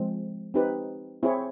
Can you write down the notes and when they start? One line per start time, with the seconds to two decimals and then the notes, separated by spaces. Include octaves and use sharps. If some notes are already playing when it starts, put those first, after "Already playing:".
Already playing: F3 G#3 C4
0.54 C4 D#4 G4 B4
1.23 C4 E4 G#4 C#5